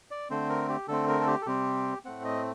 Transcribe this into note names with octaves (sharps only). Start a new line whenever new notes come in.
D5
D3 A3 C4 C5
A#4
G4
D3 A3 C4 A4
A#4
A4
G4
A4
C3 G3 C4 G4
A2 A3 C4 F#5
D#5